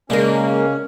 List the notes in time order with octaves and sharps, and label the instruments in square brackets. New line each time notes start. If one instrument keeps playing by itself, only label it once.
[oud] C#3 A#4 [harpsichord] G#3 D4 [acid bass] A#3 [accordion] C#4